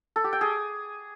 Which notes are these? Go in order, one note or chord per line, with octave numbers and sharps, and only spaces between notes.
A4
G4
G5
G#4